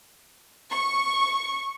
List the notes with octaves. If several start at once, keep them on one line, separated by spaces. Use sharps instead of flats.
C#6